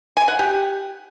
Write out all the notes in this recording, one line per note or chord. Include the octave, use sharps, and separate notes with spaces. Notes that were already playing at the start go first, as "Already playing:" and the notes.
G#5
F#5
G4